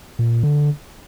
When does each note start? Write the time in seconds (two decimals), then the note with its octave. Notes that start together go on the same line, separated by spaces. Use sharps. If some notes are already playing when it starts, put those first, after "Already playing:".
0.19 A#2
0.43 D3